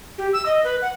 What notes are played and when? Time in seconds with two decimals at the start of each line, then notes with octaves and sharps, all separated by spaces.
0.18 G4
0.33 E6
0.46 D#5
0.64 B4
0.82 F#5